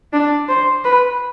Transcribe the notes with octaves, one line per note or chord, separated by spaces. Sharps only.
D4
C5
B4